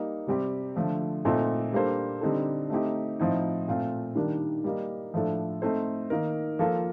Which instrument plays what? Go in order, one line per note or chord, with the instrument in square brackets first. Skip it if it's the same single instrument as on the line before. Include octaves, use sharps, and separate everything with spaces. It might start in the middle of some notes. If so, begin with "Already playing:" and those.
Already playing: [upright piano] G3 A#3 D#4
C3 G3 C4 G4
D3 F3 A3
A#2 A3 C4 D#4 A4
G3 A#3 D4 A4 C5
D3 G3 C4 D#4 A4
A3 C4 D#4 G4
A2 F3 C4 D#4
A#2 A3 C4 F4
D#3 G3 A#3 D4
G3 A#3 D#4
A2 F3 A3 D4 A4
A3 C4 D#4 A4 C5
D#3 A#3 D#4 A#4
F3 A#3 F4 A4